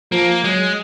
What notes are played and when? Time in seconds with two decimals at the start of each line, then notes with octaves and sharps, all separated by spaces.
0.12 F3 A#3
0.43 F#3 G#3